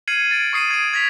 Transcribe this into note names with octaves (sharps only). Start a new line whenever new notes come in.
F6 G#6 C7 C#7 D#7 F#7
A6 D7
C#6 D#6 C7 D7 D#7
G#6 D7
G#6 A#6 B6 F7